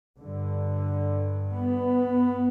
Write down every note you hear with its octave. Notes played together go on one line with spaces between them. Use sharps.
G2 D3
B3